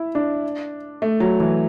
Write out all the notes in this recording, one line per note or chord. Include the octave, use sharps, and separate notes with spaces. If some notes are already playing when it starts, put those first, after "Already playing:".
Already playing: E4
D4
A3
F#3
E3